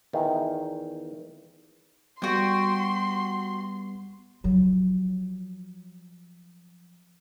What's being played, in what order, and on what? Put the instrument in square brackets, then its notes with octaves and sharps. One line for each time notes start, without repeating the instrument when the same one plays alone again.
[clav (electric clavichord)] E2 D#3
[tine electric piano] G3 B3 [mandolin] F#4 G5 [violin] C6
[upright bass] F3 F#3